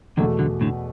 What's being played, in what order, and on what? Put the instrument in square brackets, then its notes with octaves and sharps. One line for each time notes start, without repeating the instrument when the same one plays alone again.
[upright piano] E2 B2 A3 [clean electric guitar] D3 F#3
[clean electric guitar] D3 F#3
A2 D3